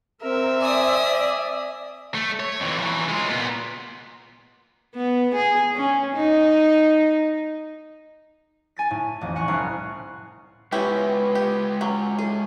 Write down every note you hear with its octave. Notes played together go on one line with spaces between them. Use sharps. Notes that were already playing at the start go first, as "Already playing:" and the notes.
C4 A#4 E5
D5 G#5 D#6
D5
A3
C#5
F2 E3
E3 F#3
G#3 F4
A#2 B3
B3
G#4
C#4
D#4
G#5 A6 B6
A2
A1 F2
F#5 G#5 A#5 C#6 F#6
C2 A2 C#4 C7
G#3 B3 C#4 E4 F4 G4
G4
F#3 C#4
A2 G#4